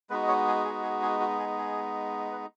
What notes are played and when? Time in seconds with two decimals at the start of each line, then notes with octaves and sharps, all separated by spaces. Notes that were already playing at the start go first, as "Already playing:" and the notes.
0.10 G#3 B3 D#4 F#4 B4
0.23 D#5
0.28 C#5
0.47 G#4
0.65 G#4
0.83 G#4
1.02 G#4
1.20 F#4
1.39 G#4
1.58 G#4
2.32 B4